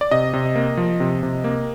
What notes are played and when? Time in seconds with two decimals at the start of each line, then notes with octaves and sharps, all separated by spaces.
0.01 D5
0.11 C3 D#5
0.33 C3
0.56 A#3
0.77 F3
1.00 C3
1.23 C3
1.44 A#3